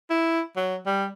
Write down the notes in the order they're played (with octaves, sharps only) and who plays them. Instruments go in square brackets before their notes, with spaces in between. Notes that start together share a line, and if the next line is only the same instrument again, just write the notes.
[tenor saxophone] E4
F#3
G3